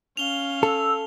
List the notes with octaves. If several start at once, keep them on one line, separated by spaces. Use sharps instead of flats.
C#4 F5 F7 G7
A4 E6